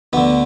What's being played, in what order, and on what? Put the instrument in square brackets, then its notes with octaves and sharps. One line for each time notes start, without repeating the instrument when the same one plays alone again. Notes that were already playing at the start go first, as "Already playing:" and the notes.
[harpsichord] D2 D3 B3